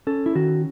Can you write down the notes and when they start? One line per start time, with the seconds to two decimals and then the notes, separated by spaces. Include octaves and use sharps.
0.07 C#4 A4
0.26 E4
0.35 D#3 F#4